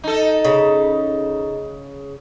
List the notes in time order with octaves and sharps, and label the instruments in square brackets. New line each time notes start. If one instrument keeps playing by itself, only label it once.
[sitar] D#4 A4
[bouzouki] C#3